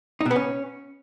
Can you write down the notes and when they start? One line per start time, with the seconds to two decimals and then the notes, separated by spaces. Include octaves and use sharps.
0.21 D#4
0.26 B2
0.31 B3
0.36 C#4